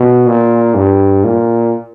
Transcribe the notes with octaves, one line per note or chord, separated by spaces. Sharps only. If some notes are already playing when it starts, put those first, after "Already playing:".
Already playing: B2
A#2
G2
A#2